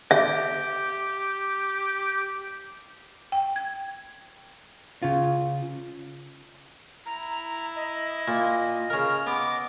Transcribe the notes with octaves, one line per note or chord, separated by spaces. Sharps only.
G4 E5
G5
G#6
C#3 F4
E4 A#5
D#5
A#2
C#3 A#4 F6
B3 D6